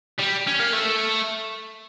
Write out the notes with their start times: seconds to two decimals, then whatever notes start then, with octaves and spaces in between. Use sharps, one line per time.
0.20 G3
0.47 C#4
0.60 A#3
0.73 A3